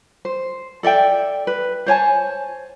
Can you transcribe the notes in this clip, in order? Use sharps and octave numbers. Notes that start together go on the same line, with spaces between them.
C5
A4 D5 E5 G5
B4
C5 C#5 G#5 A5